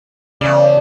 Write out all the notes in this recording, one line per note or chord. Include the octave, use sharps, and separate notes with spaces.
E2 C#3 A3 D5